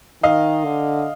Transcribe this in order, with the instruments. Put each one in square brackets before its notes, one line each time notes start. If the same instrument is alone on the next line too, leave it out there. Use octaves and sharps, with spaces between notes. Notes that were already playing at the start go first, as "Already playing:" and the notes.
[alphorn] D#3 [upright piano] D#5 F5
[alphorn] D3